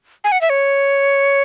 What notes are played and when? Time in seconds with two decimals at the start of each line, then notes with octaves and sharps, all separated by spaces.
0.24 G#5
0.32 F#5
0.41 E5
0.50 C#5